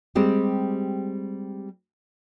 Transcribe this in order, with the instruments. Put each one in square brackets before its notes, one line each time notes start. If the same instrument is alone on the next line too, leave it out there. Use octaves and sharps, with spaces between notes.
[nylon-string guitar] G3 G#3 C4 G4